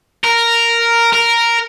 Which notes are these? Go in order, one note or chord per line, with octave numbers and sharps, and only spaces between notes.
A#4
A#4